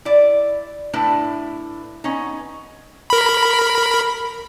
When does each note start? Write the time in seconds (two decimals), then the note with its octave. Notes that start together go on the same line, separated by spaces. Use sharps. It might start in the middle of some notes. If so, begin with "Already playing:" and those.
0.05 E4 D5
0.93 A2 A3 D4 E4 B4
2.04 B3 C#4 D#4
3.10 A#4 B5